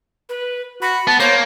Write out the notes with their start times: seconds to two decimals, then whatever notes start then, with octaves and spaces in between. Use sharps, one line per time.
0.29 B4
0.82 F#4 B5
1.07 B3 A5
1.20 A#3 C5 C#5